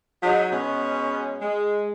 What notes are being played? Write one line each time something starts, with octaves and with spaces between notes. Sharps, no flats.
F#3 G#3 D#4
B2 G#3 C#4
G#3